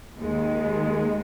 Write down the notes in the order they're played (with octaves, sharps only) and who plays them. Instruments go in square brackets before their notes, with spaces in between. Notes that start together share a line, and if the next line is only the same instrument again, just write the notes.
[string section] D#2 D#3 G#3